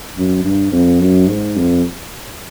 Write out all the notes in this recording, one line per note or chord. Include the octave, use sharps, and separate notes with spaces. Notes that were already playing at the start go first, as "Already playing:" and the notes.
F#2
G2
F2
F#2
G#2
F2